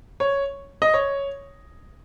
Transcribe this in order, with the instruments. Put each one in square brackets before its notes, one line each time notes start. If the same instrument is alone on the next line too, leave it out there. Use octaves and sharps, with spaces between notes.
[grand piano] C#5
D#5
C#5